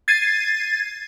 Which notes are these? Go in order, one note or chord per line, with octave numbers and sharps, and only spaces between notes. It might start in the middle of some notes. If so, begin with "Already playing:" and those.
G#6 A6 C7 D#7